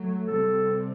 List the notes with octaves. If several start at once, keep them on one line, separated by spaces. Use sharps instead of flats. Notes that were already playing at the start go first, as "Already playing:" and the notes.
Already playing: F#3 A3
C3 G3 C4 A4